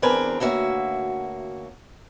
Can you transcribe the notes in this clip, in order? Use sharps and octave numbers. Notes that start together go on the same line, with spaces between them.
E2 C4 D4 A#4 B4 G#5
D2 A#3 C#4 F#4 E5